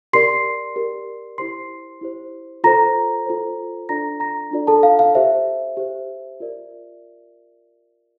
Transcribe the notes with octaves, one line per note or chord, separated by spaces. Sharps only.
G4 A#4 D5 C6 C7
G4 A#4 D5
E4 G4 C5 C6 C7
E4 G4 C5
F4 A4 C5 A#5 A#6
F4 A4 C5
D4 F4 A4 D5 A#5 A#6
A#5 A#6
D4 F4 A4 D5
A4 A5
F5
F5
G4 C5 E5
G4 C5
F4 A#4 D5